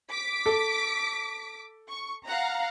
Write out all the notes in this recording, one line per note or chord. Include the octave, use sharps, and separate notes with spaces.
D6 B6 D7
A4
C#6
F5 F#5 A#5